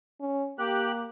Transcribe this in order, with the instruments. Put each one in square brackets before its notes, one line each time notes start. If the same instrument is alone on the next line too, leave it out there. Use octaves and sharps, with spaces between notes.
[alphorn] C#4
[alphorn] A#3 [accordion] G4 F#6